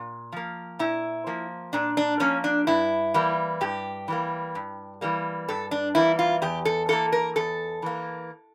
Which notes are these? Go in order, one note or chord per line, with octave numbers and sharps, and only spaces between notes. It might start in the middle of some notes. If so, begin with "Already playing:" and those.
Already playing: A#2
F3 A#3
A#2 E4
F3 A#3
A#2 D4
D4
F3 A#3 C#4
D4
G2 E4
E3 G3 A#3
G2 G4
E3 G3 A#3
G2
E3 G3 A#3
G2 A4
D4
E3 G3 A#3 E4
F4
E2 G4
A4
E3 A#3 A4
A#4
E2 A4
E3 A#3